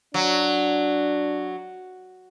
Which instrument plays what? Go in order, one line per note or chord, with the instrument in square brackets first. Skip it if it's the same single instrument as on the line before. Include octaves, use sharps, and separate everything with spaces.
[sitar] F#3 [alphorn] D4